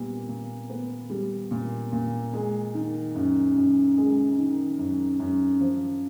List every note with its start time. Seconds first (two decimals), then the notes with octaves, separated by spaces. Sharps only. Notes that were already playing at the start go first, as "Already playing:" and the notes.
Already playing: A#2 G3 B3
0.28 A#2
0.69 B3
1.10 G3
1.51 A#2
1.92 A#2
2.33 G#3
2.74 D#3
3.15 F#2
3.56 F#2
3.97 G#3
4.38 D#3
4.79 F#2
5.19 F#2
5.61 F3